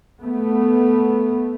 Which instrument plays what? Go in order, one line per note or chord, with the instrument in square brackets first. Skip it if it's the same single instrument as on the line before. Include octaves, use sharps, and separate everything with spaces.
[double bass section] A3 B3